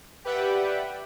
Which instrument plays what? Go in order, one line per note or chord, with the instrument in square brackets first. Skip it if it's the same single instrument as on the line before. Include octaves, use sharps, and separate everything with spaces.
[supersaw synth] G4 B4 D5 E5 F#5 G5